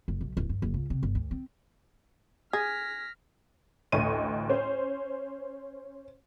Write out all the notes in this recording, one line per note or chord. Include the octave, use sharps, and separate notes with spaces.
F#1
B1
D1
G2
F#1
C#2
C3
G1
D2
C4
G#4 F6 G#6 A#6 B6
A1 D2 D#5 C#6 D#7
C#4 C5